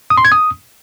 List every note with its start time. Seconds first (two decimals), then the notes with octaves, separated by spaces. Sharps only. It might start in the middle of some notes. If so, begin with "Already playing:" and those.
0.10 D#6
0.17 C6
0.25 G#6
0.32 D#6